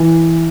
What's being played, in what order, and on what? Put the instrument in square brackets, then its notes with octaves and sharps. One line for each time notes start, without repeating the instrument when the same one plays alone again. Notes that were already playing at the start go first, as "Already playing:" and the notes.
Already playing: [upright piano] E3